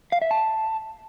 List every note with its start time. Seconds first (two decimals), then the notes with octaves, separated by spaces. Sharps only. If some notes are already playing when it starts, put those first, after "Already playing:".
0.12 F5
0.22 E5
0.31 A5